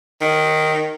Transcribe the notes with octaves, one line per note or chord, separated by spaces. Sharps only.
D#3